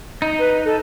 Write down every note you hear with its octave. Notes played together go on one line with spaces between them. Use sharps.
D#4
B4
A4